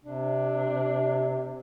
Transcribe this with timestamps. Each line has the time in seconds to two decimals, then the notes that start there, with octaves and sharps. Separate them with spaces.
0.05 C3 D4